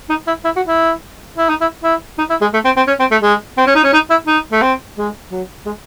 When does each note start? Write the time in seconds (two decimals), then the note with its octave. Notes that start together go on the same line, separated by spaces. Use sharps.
0.09 D#4
0.27 E4
0.44 E4
0.56 F#4
0.67 E4
1.37 E4
1.49 D#4
1.61 E4
1.83 E4
2.18 D#4
2.30 E4
2.41 G#3
2.53 A3
2.65 C4
2.76 C4
2.87 C#4
3.00 C4
3.11 A3
3.22 G#3
3.57 C4
3.67 C#4
3.75 D#4
3.84 C#4
3.93 D#4
4.10 E4
4.27 D#4
4.52 A3
4.62 C4
4.97 G#3
5.31 F#3
5.66 G#3